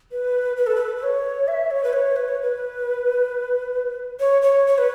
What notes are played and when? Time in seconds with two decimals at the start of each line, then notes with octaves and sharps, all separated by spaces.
0.12 B4
0.57 B4
0.67 A4
0.75 B4
0.96 B4
1.03 C#5
1.48 E5
1.71 C#5
1.84 B4
1.93 C#5
2.16 B4
2.28 C#5
2.42 B4
4.20 C#5
4.42 C#5
4.67 C#5
4.78 B4